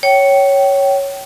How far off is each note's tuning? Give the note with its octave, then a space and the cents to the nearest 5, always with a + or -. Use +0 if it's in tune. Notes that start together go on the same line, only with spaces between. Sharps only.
C#5 +0 G5 -25